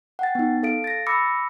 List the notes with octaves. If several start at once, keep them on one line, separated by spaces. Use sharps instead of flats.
F#5 G5 A6
B3 D#4
A4 F5 D7
A6 A#6
B5 D6 E6 A#6 C#7